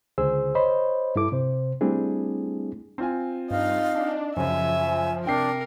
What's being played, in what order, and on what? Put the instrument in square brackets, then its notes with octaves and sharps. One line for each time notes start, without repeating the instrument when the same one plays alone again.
[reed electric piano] C#2 D3 G#4 C5 E6
C5 C#5 D#5 B5
G2 E4 A4 D6
C3 C5
G3 A3 C4 D4 E4 G#4
[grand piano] C4 F4 G#5
[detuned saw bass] G2 [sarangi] D#4 [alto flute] F5
[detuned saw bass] D4
[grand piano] F#2 C#3 [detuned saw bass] F3 [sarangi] E5 [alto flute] G#5
[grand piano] C3 G5 C7 [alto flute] D4 [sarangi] A#4